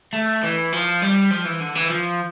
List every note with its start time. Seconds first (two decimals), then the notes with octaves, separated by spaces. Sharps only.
0.13 A3
0.43 E3
0.72 F3
1.02 G3
1.31 F3
1.46 E3
1.61 D3
1.76 E3
1.90 F3